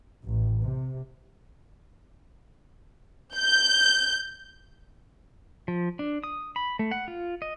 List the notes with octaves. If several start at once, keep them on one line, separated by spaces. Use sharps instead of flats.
A1
C3
G6
F3
D4
D#6
B5
A3
F#5
F4
D#5